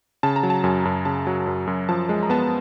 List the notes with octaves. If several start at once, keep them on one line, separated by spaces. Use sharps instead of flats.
C#3 A5
A#5
F#3
A5
F#2 G#5
F#2
C#3 A5
F#3
F#2
F#2
F3 A5
G#3
A#5
B3 A5